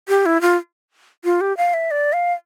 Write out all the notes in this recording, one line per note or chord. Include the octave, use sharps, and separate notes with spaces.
G4
E4
F4
F4
G4
F5
E5
D5
F5